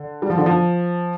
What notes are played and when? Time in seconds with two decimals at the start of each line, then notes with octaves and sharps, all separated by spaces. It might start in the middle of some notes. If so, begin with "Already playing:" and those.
Already playing: D3
0.22 G3
0.30 F3
0.38 D3
0.46 F3